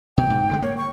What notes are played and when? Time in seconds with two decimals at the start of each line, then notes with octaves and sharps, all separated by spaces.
0.18 B2 G5
0.30 G#2
0.49 G2 D3 G#3
0.62 A#3 C#5
0.78 C#6